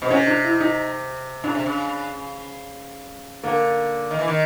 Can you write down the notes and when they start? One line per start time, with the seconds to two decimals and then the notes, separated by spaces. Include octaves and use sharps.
0.02 B2 C4
0.10 C3 C#4
0.27 D4
0.44 E4
0.60 D#4
1.44 C#3 D4
1.55 C3
1.66 C#3
3.43 D3 A#3
4.11 D#3
4.19 E3
4.28 D#3